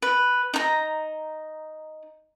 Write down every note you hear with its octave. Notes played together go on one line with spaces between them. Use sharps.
B4
D#4 A#5